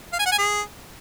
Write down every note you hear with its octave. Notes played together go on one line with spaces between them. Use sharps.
F5
G#5
F#5
G#5
G#4